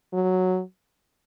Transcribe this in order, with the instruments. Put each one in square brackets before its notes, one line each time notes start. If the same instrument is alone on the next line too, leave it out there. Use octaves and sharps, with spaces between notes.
[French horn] F#3